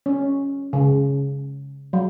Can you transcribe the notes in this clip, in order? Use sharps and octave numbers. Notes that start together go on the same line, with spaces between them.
C#4
C#3
F#3